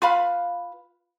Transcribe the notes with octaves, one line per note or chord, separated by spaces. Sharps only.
F4 B4 F5 B5